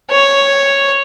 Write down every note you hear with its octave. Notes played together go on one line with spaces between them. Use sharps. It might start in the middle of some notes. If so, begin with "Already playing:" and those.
C#5